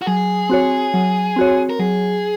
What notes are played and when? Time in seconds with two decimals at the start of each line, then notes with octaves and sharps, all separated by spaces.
0.02 F#4
0.06 F#3 G#4
0.49 C4 F#4 C#5
0.94 F#3
1.36 C4 F#4 C#5
1.70 A#4
1.79 F#3 G#4